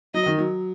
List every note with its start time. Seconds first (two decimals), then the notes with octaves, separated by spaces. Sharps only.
0.14 F#3 D#5
0.26 D#3
0.38 F#3